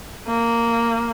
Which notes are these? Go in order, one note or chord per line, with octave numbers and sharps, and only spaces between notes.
A#3